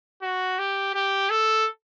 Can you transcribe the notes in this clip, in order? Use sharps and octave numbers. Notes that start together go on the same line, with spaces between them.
F#4
G4
G4
A4